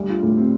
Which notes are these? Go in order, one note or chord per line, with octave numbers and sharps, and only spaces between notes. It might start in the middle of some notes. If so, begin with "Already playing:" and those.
Already playing: D2 G3
F4
A2
C4